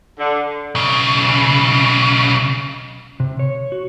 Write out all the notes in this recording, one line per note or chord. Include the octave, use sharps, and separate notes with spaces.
D3
B1 C#3
C3
C#5
F#4